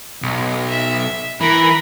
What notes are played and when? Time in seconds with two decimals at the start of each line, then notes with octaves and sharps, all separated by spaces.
0.23 B1
0.68 E5
1.41 E3 A#4 B5